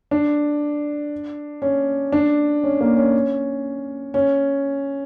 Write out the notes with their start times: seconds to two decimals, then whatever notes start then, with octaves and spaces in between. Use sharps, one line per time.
0.11 D4
1.62 C#4
2.12 D4
2.64 C#4
2.81 A#3
2.97 C#4
4.14 C#4